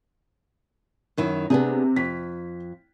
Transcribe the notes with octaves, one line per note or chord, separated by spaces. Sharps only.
F#2 D#3 E4
C3 B3 D4 G#4
F2 B6